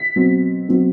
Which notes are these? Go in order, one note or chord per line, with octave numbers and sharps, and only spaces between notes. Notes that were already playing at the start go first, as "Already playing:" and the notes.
Already playing: B6
B2 F#3 C4
B2 F#3 C4